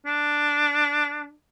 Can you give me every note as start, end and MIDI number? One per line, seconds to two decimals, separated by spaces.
0.06 1.31 62